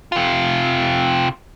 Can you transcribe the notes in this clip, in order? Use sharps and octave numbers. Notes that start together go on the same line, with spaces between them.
C3 F4